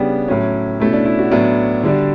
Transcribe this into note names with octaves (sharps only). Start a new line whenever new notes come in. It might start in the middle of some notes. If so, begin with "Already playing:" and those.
Already playing: C#3 G3 B3 D4 G4
A2 F#3 C#4
B2 A3 C#4 E4
D4
E4
F#4
A2 F#3 B3 D4
D3 G3 D4